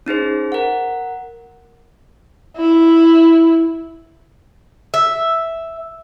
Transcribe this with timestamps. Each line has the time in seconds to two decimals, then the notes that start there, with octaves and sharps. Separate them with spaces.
0.06 C#4 D#4 G#4 C5
0.52 A#4 F#5
2.57 E4
4.94 E5